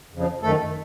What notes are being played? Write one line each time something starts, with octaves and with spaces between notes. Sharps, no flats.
F2 C#3 F3
F#2 D#3 A3 A4